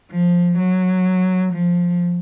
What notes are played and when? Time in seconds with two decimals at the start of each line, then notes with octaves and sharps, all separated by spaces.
0.11 F3
0.58 F#3
1.53 F3